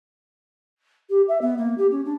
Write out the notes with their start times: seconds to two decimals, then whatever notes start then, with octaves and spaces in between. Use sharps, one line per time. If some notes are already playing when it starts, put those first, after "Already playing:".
1.09 G4
1.28 E5
1.41 B3
1.57 A#3
1.77 G4
1.91 C#4
2.05 D4